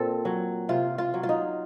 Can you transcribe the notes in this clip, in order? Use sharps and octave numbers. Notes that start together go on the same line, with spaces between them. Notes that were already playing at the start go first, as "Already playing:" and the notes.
Already playing: A#2 C4 A4
F#3
C3 F4
F4
F#3
F4
D#4